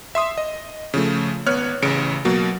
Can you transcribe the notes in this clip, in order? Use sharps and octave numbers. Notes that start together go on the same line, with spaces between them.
E5 C6 D#6
D#5
C#3 F3 A3
G#1 B3 C#5 F6 F#6
A1 C#3 C#7 D7
B2 F#3 A#3